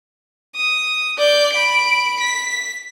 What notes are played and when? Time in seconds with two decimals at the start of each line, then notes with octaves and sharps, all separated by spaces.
0.55 D#6
1.18 D5 G6
1.52 B5 D7
2.20 B6